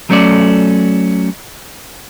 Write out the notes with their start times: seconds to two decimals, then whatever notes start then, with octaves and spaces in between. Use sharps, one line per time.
0.10 F#3 A3 C#4 A4 D5